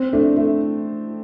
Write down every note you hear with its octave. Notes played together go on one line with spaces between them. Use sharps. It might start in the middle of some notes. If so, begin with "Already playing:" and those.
Already playing: C4
A3 D4
A3